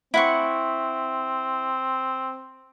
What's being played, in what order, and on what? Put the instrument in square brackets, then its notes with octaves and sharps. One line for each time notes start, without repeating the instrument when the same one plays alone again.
[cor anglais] C4 [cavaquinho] E4 F#5 C#6